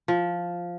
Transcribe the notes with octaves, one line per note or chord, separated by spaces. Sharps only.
F3